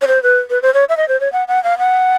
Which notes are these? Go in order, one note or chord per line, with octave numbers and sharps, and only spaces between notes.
C#5
C5
B4
B4
C5
C#5
E5
D#5
C5
C#5
F#5
F#5
F5
F#5